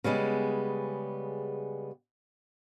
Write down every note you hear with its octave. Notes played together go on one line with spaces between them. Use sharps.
C#3 G3 G#3 B3